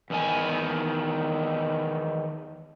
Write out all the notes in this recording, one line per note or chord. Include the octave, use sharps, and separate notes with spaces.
E2 D#3 G#5